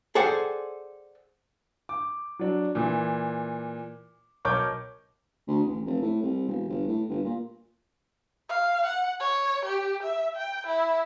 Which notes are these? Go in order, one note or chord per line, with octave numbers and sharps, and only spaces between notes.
G#4 A4 C5 D5 F#5 G5
D6
F#3 D4
A#2 E3
B1 A#4 C#5 C#6 D6 G6
D2
A1
F1
A2
C2
E1
G1
A2
G1
A#2
F5
F#5
C#5
G4
E5
G5
E4